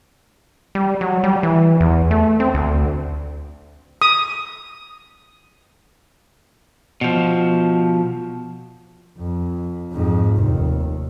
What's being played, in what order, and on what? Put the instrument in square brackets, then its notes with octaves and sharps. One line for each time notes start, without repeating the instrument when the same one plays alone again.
[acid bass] G3
F#3
G3
E3
E2
A3
C4
D2
[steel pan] D#6
[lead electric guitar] B2 F3
[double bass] F2
F2 G#2
F1 D#2